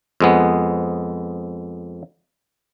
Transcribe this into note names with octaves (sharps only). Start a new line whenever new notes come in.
F2 G#3 B3